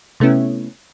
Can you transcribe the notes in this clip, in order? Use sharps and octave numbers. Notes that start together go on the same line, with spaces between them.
C3 A3 B3 C#4 E4